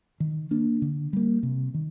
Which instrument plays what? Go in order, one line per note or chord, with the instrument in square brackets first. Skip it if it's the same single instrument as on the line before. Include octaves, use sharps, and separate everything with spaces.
[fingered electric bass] D#3
A#3 D4
D3
G3 A#3
C3
D#3